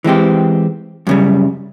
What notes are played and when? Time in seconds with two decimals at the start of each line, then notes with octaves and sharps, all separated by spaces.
0.04 E3 G#3 C4 G4
1.07 F#2 C#3 G3